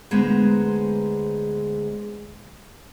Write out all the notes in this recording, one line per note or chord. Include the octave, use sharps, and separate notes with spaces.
D2 G#3 B3 G#4 C5 A#5